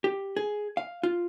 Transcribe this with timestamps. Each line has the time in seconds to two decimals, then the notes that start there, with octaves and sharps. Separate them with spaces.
0.04 G4
0.37 G#4
0.77 F5
1.03 F4